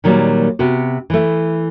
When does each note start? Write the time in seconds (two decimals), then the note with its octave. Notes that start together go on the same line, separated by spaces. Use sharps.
0.04 A#2 D#3 F#3 G3 A#3
0.59 C3 B3 F#4
1.10 E3 A3